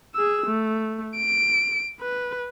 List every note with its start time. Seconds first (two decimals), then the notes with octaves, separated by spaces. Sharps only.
0.14 G#4 E6
0.47 A3
1.17 D7
2.01 B4